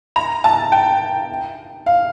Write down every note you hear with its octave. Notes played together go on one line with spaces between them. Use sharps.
A#5
A5
G5
F5